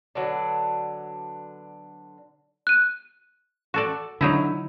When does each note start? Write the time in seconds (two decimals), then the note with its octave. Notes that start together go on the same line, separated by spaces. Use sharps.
0.15 D3 F#3 B3 D4
2.67 F#6 D#7
3.74 F#4 A4 D5
4.21 D3 F#3 D#4 E4